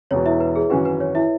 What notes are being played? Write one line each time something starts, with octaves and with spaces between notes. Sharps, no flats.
E1 E2 B2 C#5
E4 E5
B4
G#4
G#1 F#2 E3 C#4 F#4 B4
B4
C#5
E4 E5